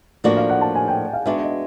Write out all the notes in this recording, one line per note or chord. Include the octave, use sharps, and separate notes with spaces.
A2 F3 A#3 D4 F#4 D5
F5
F#5
A5
G#5
G5
F5
G#3 B3 D4 F#4 E5
E5
D#5